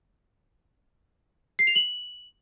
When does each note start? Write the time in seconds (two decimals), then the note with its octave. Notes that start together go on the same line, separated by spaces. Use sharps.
1.59 C7
1.67 F7
1.75 F#7